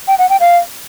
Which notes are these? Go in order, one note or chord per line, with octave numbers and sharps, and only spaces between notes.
G5
F#5
G5
F5